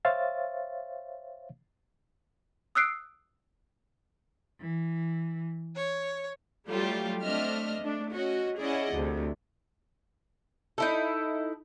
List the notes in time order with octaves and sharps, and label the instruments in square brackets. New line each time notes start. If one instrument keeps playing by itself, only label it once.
[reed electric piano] C5 C#5 E5 F5 A6
[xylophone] D#6 E6 F#6 C7 D7
[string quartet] E3
C#5
[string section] F#3 G3 A3 F4 G4
A3 C4 D4 D#5 E5 F6
A3 D4
C#4 F#4 D#5
C#4 E4 G#4 D5 D#5 F#5
D2 C3
[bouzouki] D#4 E4 A4